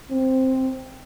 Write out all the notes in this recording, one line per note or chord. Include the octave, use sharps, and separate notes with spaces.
C4